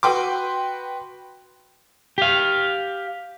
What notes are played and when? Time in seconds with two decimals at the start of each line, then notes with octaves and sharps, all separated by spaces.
0.03 F#4 B4 G5 C6 D6
2.18 G4 F5